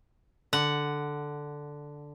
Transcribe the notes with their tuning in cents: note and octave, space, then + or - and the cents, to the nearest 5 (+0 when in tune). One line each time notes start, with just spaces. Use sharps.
D3 +0 F#5 +0